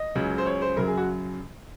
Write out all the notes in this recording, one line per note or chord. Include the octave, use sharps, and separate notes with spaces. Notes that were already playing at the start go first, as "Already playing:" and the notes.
Already playing: D#5
C#2 C#3 F#3
C5
C#5
C5
F#2 C#3 F#3 A#4
G#4
F#4